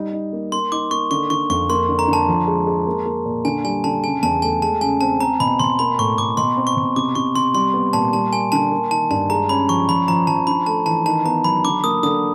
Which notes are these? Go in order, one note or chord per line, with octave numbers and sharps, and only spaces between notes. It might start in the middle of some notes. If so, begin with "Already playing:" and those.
Already playing: G3 D#4
D#4
A#3
A#3 C6
D#4 D6
A#3 C#6
D3 C#6
D3 C#6
F2 C#6
A#3 C6
D3
A#5
D3
A5
F3
G#3
G#3
A#3
A#3
A#2
D3 G#5
G3 G#5
D3 A5
C#3 G#5
E2 A5
A3 G#5
G#3 A5
C#3 G#5
C4 A5
C4 A#5
B2 B5
B2 C6
A#3 B5
A2 C#6
A2 D6
B2 C6
C4
C#6
B2
C3 D6
C3 C#6
C3 C6
G3 C6
B3
A#2 A5
G3 A5
A#3 G#5
D3 A5
A#3
D#3 A5
G2 A5
G#3 A#5
C#4 B5
F3 C#6
F3 B5
F3 A#5
F3 A5
D4 B5
A3 A5
E3 A5
D#3 A5
B3 A#5
F#3 B5
D3 D6
A#3 D#6
D3 D#6